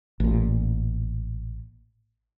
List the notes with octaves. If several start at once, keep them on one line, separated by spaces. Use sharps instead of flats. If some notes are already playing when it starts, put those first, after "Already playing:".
A1 A#2